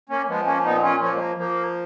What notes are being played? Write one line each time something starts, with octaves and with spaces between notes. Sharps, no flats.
A#3 C#4
F3 G#3 B3
A#3 C#4
A#2 B3 D#4
C#4 F4
F3 A#3 C#4
G#3
A#3
F3 A#3